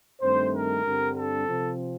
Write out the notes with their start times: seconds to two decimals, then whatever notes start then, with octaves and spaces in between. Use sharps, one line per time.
0.22 G2 D#3 A3 C4 C5
0.54 A#4
0.84 G2 D3 G3 C4
1.15 A4
1.47 C3 F3 C4